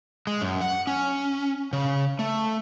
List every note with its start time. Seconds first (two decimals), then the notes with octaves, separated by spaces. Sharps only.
0.27 G#3
0.42 F#2
0.61 F#5
0.87 C#4
1.73 C#3
2.19 A3